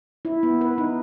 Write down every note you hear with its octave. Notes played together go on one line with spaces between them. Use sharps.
E4
B3
B4
D#4